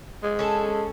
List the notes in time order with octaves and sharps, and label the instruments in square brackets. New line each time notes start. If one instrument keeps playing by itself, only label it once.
[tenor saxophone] G#3
[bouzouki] C#4 A4